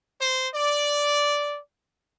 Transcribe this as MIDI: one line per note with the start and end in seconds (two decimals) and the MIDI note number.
0.19 0.48 72
0.55 1.59 74